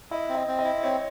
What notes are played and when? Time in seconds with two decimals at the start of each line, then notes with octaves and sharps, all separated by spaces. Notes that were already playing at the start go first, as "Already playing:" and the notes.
0.11 E4 D#5
0.29 C4
0.35 D#5
0.47 C4
0.59 D#5
0.64 E4
0.83 C4 C#5